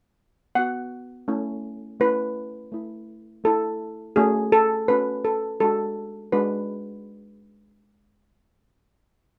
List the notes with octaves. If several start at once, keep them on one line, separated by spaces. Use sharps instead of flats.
B3 F#4 F#5
A3 C#4 E4
A3 C#4 E4 B4
A3 E4
A3 E4 A4
A3 C#4 F#4 G#4
A4
A3 C#4 F#4 B4
A4
G#3 D4 F#4 A4
G#3 D4 F#4 B4